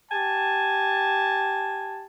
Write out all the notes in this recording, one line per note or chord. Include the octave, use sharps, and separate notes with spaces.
G4 G#5 A5